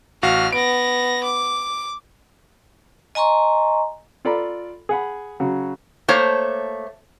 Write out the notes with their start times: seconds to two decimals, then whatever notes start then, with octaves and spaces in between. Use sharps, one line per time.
0.23 A1 F#4 F5 F6
0.53 B3 A#6 D7
1.23 D6
3.15 D#5 G#5 A#5 C6 C#6
4.25 F4 A4 D5 A#5 B5
4.89 G#4 F#5 B5
5.40 C#3 F#3
6.08 A3 A#3 C5 C#5